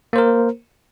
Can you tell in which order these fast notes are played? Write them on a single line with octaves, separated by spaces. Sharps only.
A#3 C5 A#4